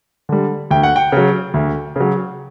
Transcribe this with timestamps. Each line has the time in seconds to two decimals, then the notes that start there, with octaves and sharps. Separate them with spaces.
0.29 D3 G3
0.71 D2 G5
0.83 F#5
0.96 G5
1.12 C#3 F#3
1.54 D2
1.96 C#3 F#3